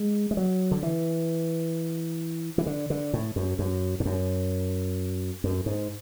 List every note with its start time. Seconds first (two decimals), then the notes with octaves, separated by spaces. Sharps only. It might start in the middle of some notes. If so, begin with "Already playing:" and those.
Already playing: G#3
0.31 G#3
0.37 F#3
0.71 D3
0.83 E3
2.58 E3
2.66 D3
2.90 D3
3.13 A2
3.36 F#2
3.59 F#2
4.00 G#2
4.06 F#2
5.44 F#2
5.66 G#2